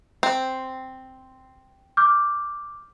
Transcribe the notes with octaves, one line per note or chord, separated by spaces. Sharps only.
C4
D6 F6 G6